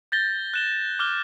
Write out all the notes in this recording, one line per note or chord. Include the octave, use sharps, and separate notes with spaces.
G6 A6 A#6 G7
F#6 E7 G7
D6 F6 G7